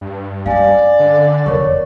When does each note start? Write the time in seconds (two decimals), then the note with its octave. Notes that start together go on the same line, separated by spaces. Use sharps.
0.01 G2
0.46 C#4 D5 F5 G#5
0.99 D3
1.46 F1 E2 A#4 C#5 C#6